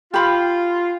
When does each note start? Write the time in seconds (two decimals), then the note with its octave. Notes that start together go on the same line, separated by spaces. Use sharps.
0.14 F4 G4 B5